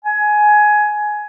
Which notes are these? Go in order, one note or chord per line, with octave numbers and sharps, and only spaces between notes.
G#5